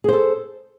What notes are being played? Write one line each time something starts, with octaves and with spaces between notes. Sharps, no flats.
G#4 A4 C5